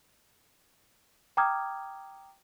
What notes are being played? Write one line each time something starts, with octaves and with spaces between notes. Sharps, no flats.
G5 A#5 D6 D#6 F6 G#6